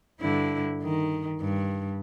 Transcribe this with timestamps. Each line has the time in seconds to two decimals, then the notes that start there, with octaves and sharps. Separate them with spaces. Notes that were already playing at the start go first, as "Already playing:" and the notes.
0.21 G2 D3 E4
0.83 D#3
1.40 G2